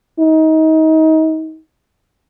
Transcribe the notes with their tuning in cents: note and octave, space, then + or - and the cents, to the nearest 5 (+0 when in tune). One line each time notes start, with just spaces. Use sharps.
D#4 +30